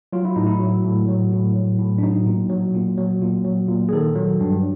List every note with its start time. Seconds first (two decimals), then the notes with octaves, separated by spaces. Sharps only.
0.13 F#3 F4
0.25 E4
0.36 A2 D#4
0.47 E4
0.60 F#3
0.84 A2
1.08 F#3
1.32 A2
1.56 F#3
1.79 A2
1.98 D4
2.03 F#3 D#4
2.26 A#2
2.50 F#3
2.74 A#2
2.98 F#3
3.22 A#2
3.45 F#3
3.68 A#2
3.89 G#4
3.92 D#3 A4
4.16 F#3
4.40 G2